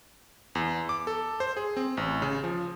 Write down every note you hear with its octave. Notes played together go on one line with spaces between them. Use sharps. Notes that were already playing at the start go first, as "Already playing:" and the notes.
E2
D6
A4
C5
G#4
C4
A1
C#3
F3